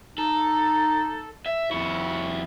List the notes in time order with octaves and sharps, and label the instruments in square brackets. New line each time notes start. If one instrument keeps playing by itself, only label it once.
[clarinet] D#4 [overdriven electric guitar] A4
[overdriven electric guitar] E5
[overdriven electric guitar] F2 E4 [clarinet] C#6